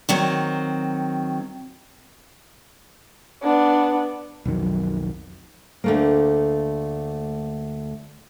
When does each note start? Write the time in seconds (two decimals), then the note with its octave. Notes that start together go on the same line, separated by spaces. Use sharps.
0.09 D#3 F#3 C4
3.43 B3 D4
4.46 B1 F2 D#3 F#3
5.84 D2 A3 A#3